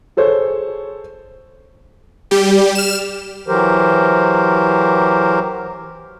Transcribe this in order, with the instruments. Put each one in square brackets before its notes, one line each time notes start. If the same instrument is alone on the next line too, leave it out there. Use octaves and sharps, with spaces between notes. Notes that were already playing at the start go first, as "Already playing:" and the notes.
[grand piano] G#4 A4 C5 C#5
[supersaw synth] G3 G4
F6 E7
[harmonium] E3 F#3 G4 A#4 C5